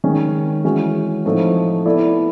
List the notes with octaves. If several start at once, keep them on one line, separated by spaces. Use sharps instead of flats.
D#3 G#3 C#4
E3 G#3 C#4 F#4
A2 F3 A3 C4 D#4
B3 E4 A4 D5